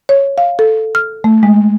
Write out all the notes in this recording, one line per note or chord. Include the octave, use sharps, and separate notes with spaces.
C#5
F5
A4
F6
A3
G#3